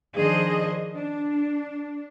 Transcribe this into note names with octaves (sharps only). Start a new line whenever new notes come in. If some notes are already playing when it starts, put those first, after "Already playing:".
D#3 F3 D4 G#4 C5 D#5
D4